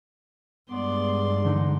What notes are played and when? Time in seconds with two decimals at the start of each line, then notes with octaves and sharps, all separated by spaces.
0.70 G2 G#3 B3 D5 C6
1.45 E2 G#2 D3 D#4